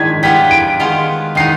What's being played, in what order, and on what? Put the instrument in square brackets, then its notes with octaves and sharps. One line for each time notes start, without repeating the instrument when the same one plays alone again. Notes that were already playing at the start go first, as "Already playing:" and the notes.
Already playing: [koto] D#3 G#3 D4 G#4 [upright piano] G#6 B6
[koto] G3 B3 F4 G#4 [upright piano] B6
[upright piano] D7
[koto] D#3 G#3 B3 F4
[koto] D#3 B3 D#4 [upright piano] C7